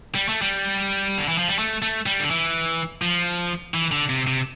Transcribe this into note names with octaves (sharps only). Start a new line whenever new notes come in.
G3
A3
G3
D3
E3
F3
G3
A3
A3
G3
D3
E3
F3
E3
D3
C3
C3